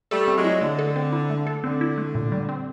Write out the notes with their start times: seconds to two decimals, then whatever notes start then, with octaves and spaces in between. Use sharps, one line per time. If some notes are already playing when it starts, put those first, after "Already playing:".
0.11 G3 A3 A4
0.28 C4
0.36 F#3 G#3
0.44 E4
0.61 D3 A3
0.79 A4
0.96 C4
1.12 E4
1.30 A3
1.47 A4
1.64 D3 C4
1.81 E4
1.98 A3
2.15 A#2
2.32 G3
2.49 C4